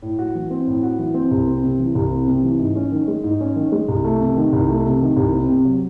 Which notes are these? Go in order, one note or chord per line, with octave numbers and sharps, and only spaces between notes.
A2
F#4
E3
C4
A2
F#4
E3
C4
C2
C4
C3
E3
C2
C4
C3
E3
G#2
C#4
D#3
G#3
G#2
C#4
D#3
G#3
C2
A3
C3
D#3
C2
A3
C3
D#3
C2
C4
C3
F#3